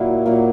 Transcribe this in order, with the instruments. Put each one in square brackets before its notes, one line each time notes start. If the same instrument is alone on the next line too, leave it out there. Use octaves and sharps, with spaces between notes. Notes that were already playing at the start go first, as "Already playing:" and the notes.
Already playing: [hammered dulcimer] A#2 F#3 A#3 E4
A#2 F#3 A#3